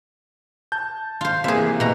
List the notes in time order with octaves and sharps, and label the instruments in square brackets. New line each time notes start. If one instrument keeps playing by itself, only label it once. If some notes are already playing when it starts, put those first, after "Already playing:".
[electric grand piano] A5 G6
[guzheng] F4 C5
[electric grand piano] C3 E3 A#3 [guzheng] G#4 E5
[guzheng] B2 A#5